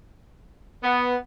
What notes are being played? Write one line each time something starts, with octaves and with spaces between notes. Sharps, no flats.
B3